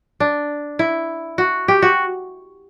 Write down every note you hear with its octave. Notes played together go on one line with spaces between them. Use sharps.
D4
E4
F#4
G4
F#4